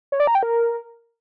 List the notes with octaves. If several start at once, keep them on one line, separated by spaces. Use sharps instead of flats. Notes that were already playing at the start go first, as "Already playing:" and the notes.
C#5
D5
A#5
G5
A#4